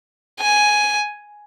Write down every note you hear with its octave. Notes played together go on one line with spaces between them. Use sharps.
G#5